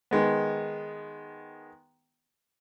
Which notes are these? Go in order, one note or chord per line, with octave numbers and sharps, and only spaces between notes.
D#3 G#3 B3